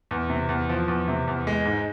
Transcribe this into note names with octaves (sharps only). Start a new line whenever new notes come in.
E2
C3
E2
F3
E2
C3
E2
G#3
G#2